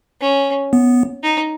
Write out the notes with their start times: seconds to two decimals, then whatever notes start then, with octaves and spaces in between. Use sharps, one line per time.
0.21 C#4
0.73 B3
1.23 D#4